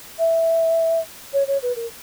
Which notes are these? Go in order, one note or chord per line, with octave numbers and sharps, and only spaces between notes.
E5
C#5
C#5
B4
A#4